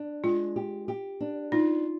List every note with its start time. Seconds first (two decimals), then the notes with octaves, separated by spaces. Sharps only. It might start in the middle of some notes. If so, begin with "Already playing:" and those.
Already playing: D4
0.24 G#3 F4
0.56 G4
0.88 G4
1.20 D4
1.52 D#4 F4